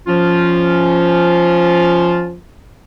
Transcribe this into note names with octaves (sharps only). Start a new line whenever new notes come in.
F3 C#4 F4